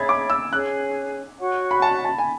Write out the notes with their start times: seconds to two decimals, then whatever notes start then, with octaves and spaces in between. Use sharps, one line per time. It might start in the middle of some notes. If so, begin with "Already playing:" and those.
Already playing: G#4 C#5 E5 B5 G#6 A6
0.09 D6
0.30 E6
0.52 C#4 G#4 C#5 G#5 F#6
1.40 F#4 C#5 F#5 C#6
1.71 B5
1.82 A5
2.05 A5
2.18 G#5